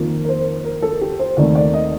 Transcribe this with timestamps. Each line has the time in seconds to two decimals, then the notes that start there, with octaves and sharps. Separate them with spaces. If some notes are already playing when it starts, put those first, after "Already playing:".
Already playing: F2 D#3 A#3
0.24 A#4
0.29 C5
0.64 A#4
0.82 A4
1.01 G4
1.19 C5
1.37 D#2 D#3 A3 C4 D5
1.55 D5
1.73 D#5